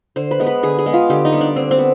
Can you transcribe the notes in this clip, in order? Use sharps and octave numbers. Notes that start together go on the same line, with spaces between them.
D3 C5
B4
G#3 B3
B4
D3 G#4
G#4
G#3 B3
F4
D3 G4
D#4
G3 B3
D4
D3 C4
C4
B3